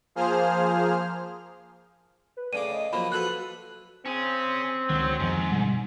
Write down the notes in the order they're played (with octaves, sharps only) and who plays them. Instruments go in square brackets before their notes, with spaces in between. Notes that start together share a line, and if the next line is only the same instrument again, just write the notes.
[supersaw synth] F3 A#3 G#4 C5 F6
[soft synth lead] B4
[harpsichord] A2 C#3 D6 [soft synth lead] D5 [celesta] D#7
[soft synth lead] D#5
[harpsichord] F3 F#3 A#3 [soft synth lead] F4 [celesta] B5
[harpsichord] F4 A4 B4 [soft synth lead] F#4 [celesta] F#6 F#7
[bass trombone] C4 [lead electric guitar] C#4 G#4
[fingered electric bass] C#2 D#3 [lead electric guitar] F#3
[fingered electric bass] F2 D#3 F3 [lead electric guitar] G#2
[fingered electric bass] G1 B2 G3